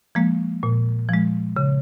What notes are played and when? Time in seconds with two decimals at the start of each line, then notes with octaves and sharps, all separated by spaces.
0.15 F3 G#3 A#3
0.63 A#2
1.09 F3 G#3
1.57 C#3